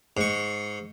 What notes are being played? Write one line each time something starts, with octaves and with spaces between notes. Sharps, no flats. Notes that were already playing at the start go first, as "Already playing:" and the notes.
G#2 C#6